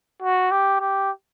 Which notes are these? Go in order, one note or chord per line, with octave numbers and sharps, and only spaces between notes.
F#4
G4
G4